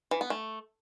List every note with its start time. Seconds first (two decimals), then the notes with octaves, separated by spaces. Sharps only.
0.11 E3
0.21 B3
0.30 A3